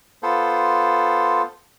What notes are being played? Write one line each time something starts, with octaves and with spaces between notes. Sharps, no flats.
B3 F4 A4 C5